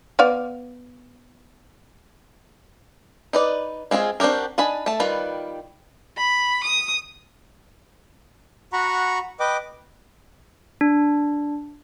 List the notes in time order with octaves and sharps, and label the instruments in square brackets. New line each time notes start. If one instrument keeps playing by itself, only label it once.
[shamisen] B3 D5 F5
[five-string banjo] D#4 B4 D5
G#3 C4 F4 G#4
C4 D4 F#4 G4 A#4
D4 D#4 G#5 A5 B5
A3 A5
D#3 G3 F4 B4
[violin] B5
D#6
[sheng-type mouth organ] F#4 F#5 A#5 B5 C#6
B4 D#5 G5 D6
[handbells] D4